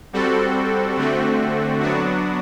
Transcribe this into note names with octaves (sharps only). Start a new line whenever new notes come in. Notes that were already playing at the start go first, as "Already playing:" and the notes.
G3 C4 F#4 A4
D3 A3 C4 F#4
F#3 B3 D4 F#4